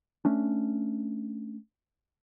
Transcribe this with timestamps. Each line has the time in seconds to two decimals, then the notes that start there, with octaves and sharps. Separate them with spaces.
0.25 A3 C#4 D4